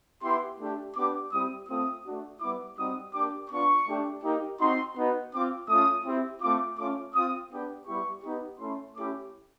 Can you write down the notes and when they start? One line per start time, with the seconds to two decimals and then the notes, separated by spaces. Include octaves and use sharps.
0.23 B3 E4 G4 C6
0.59 A3 D4 G4
0.95 B3 D4 G4 D6
1.32 G3 C4 E4 G4 D#6
1.68 A3 C4 F4 D#6
2.05 A3 D4 F#4
2.41 G3 B3 E4 D6
2.77 G3 C4 D#4 F#4 D#6
3.14 A#3 D4 G4 D6
3.50 B3 D4 F4 C#6
3.87 A3 D4 G4
4.23 A#3 D#4 G4
4.59 C4 D#4 F#4 C6
4.96 B3 D#4 F#4
5.32 C4 F4 D6
5.68 A3 C#4 F4 D#6
6.05 C4 E4 G4
6.41 A3 C4 F4 D6
6.78 A3 C#4 F4 D6
7.14 C4 F4 D#6
7.51 B3 D4 G4
7.87 G3 B3 E4 G4 C#6
8.24 B3 D#4 G4
8.60 A3 C#4 E4 C6
8.96 A3 C#4 E4 G4 D6